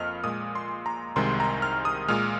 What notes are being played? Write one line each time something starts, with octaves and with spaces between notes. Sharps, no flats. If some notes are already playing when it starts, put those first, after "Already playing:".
Already playing: F2 F3 A#3 D#5 F6
A#2 G#3 D#6
C6
A#5
C2 C3 D#3 G#3 C6
A#5
F6
D#6
A#2 G#3 F6